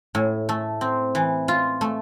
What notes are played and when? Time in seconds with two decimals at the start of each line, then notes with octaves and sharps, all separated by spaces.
0.15 A2
0.49 A3
0.81 C4
1.15 E3
1.48 F4
1.81 A3